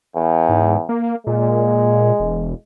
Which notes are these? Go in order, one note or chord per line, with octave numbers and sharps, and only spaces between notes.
E2
G#2
A#3
A#2 G#3
E1